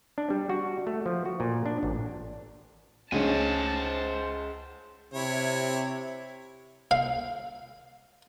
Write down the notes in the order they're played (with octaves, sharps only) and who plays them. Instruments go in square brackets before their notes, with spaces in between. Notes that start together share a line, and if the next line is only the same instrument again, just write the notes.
[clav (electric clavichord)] D4
G3
F#4
A3
F3
F#4
A#2
D4
A1
[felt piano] C#2 C#4 [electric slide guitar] C5 F#5 G#5 [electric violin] A5
[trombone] C3 [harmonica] E4 C#5
[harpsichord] F5